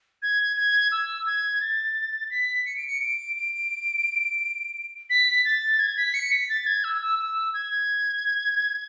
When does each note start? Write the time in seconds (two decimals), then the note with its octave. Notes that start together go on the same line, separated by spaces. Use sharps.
0.23 G#6
0.57 G#6
0.92 E6
1.27 G#6
1.61 A6
2.31 B6
2.66 C#7
2.77 D7
2.87 C#7
3.01 D7
3.36 D7
5.10 B6
5.45 A6
5.79 G#6
5.97 B6
6.14 C#7
6.32 B6
6.49 A6
6.67 G#6
6.84 E6
7.01 E6
7.19 E6
7.54 G#6